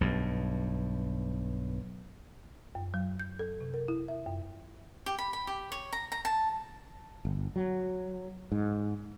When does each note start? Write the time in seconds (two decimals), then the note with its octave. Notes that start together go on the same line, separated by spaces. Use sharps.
0.01 B1 G2
2.75 F#2
2.94 F#3
3.20 G6
3.39 A4
3.60 C3
3.74 A#4
3.88 E4
4.08 E5
4.26 F#2
5.06 G4
5.18 B5
5.33 B5
5.47 G4
5.72 C#5
5.93 A#5
6.12 A#5
6.25 A5
7.25 G1
7.56 F#3
8.52 G#2